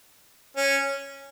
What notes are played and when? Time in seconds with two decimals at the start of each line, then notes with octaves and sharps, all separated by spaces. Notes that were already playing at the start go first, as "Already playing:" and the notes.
0.57 C#4